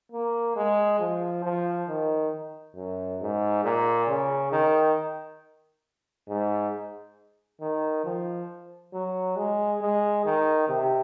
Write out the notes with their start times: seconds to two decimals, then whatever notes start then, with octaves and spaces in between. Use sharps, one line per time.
0.12 A#3
0.56 G#3
1.00 F3
1.44 F3
1.88 D#3
2.76 F#2
3.21 G#2
3.64 A#2
4.08 C#3
4.52 D#3
6.28 G#2
7.61 D#3
8.05 F3
8.93 F#3
9.36 G#3
9.81 G#3
10.25 D#3
10.69 C3